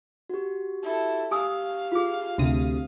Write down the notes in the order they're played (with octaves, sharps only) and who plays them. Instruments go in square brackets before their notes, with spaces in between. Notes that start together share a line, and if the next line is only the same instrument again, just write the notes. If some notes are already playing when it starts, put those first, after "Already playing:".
[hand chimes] F#4 G4
[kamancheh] E4 A4
[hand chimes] G4 [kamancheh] F5 [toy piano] G#5 D#6 E6
[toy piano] F4 G#4
[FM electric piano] D2 C3 D#6